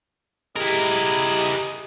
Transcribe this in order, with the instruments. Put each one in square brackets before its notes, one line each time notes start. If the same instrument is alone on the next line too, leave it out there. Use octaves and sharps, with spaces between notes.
[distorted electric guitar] E4 A#4 [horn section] G4 G#4 D#5